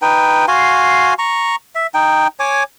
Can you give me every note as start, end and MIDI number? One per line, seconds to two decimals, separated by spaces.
0.02 0.46 63
0.02 0.46 71
0.02 0.46 79
0.48 1.14 66
0.48 1.14 77
0.48 1.14 80
0.48 1.14 84
1.19 1.56 82
1.19 1.56 85
1.75 1.87 76
1.94 2.27 63
1.94 2.27 79
2.40 2.63 73
2.40 2.63 80
2.40 2.63 86